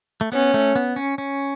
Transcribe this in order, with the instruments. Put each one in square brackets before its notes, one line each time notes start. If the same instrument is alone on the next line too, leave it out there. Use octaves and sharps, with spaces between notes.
[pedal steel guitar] A3
[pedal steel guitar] B3 [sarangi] C#4
[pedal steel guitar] A3
B3
C#4
C#4